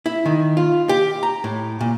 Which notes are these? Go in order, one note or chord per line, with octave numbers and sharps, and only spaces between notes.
E4
D#3
F4
G4
A#5
A2
A#2